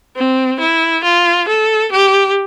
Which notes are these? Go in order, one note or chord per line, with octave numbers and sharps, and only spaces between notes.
C4
E4
F4
A4
G4